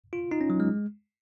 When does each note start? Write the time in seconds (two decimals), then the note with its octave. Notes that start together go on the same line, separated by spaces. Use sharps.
0.13 F4
0.31 D#4
0.41 C#4
0.50 F#3
0.60 G#3